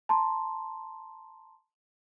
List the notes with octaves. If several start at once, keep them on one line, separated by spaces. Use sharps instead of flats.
A5 A#5 C6